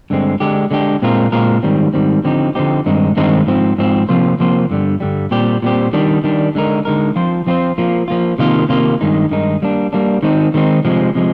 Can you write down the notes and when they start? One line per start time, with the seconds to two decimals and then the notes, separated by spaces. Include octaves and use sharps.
0.10 G2 D3 G#3 C4
0.40 D3 G#3 D4 G4
0.71 D3 G#3 D4 G4
1.02 A#2 G#3 C4 F4 A#4
1.32 A#2 G#3 C4 F4 A#4
1.63 G#2 D#3 G3 C4
1.93 G#2 D#3 G3 C4
2.24 D3 F3 C4 D#4 G4
2.55 D3 F3 C4 D#4 G4
2.86 G2 D#3 G#3 C4 D#4
3.17 G2 D#3 G#3 C4 D#4
3.47 G#2 F3 C4
3.78 G#2 F3 C4
4.09 C3 F3 A#3 F4 C5
4.40 C3 F3 A#3 F4 C5
4.71 G2 D3 G3
5.00 G2 D3 G3
5.31 A#2 G3 C4 G4
5.62 A#2 G3 C4 G4
5.93 D#3 G3 D4
6.24 D#3 G3 D4
6.55 D3 G#3 D#4 A#4
6.85 D3 G#3 D#4 A#4
7.16 F3 C4 F4 C5
7.47 F3 C4 F4 C5
7.78 F3 A#3 F4
8.08 F3 A#3 F4
8.38 C3 D#3 A#3 F4
8.69 C3 D#3 A#3 F4
9.01 G2 D#3 G#3 D#4
9.31 G2 D#3 G#3 D#4
9.62 G3 A#3 D4
9.93 G3 A#3 D4
10.23 D#3 G#3 C4 D#4
10.54 D#3 G#3 C4 D#4
10.85 C3 F3 G#3
11.15 C3 F3 G#3